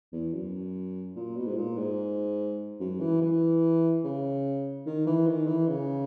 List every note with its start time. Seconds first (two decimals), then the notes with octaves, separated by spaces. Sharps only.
0.12 E2
0.33 F#2
1.15 A#2
1.36 B2
1.46 G#2
1.56 A#2
1.77 G#2
2.80 F#2
3.00 E3
3.21 E3
4.04 C#3
4.86 D#3
5.06 E3
5.27 D#3
5.48 E3
5.68 C#3